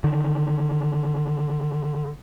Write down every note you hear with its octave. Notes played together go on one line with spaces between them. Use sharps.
D3 D#3